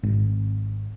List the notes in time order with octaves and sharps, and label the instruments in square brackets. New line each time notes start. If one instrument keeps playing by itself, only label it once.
[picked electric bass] G#1